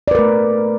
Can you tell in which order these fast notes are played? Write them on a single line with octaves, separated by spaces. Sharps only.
D5 B4 A#4 A3